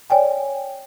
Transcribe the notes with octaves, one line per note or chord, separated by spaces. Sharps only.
C#5 D5 G5 G#5